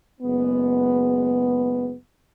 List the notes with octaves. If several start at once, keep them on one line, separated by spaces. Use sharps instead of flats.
F#1 G#3 B3